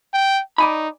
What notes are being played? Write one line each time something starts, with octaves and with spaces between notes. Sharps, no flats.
G5
D#4 D5 G#5 B5